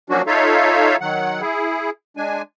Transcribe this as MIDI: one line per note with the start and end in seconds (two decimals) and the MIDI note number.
0.10 0.22 53
0.10 0.22 54
0.10 0.22 58
0.10 0.22 61
0.10 0.22 62
0.10 0.22 66
0.27 0.96 63
0.27 0.96 65
0.27 0.96 69
0.27 0.96 73
0.27 0.96 76
0.27 0.96 77
1.01 1.41 51
1.01 1.41 54
1.01 1.41 78
1.41 1.90 64
1.41 1.90 68
2.17 2.42 56
2.17 2.42 62
2.17 2.42 80